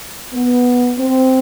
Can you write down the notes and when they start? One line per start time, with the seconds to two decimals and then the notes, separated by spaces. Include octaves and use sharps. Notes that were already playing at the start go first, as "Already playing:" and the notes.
0.33 B3
0.99 C4